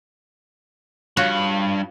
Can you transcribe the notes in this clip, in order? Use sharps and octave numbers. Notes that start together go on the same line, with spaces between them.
G2 F4 F#4 C#5 B5